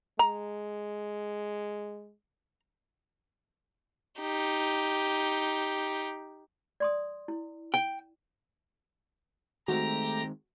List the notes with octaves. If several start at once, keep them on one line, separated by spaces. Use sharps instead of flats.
G#3 A#5
D#4 G4
D5 C6 D#6
E4
G5
D#3 G#3 A3 C4 F#4 G4 A#5